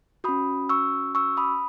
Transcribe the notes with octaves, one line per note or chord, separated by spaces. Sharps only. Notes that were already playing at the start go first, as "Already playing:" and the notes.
C#4 F#4 B5 D#6
C#6 E6
C#6 E6
B5 D#6